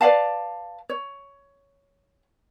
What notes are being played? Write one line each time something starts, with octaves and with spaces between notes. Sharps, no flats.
B4 D5 F5 A5
C#5